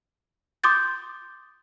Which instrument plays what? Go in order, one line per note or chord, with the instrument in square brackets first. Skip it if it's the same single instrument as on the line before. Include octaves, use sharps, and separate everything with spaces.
[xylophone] C6 D6 D#6 G6 A6